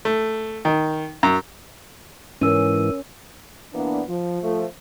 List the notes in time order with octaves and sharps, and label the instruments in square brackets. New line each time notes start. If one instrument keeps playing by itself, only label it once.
[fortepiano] A3
D#3
F#2
[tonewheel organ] G#2 E3 [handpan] C#4 [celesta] A#4 E6 D#7
[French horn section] E3 A#3 B3 D4
F3
F3 A3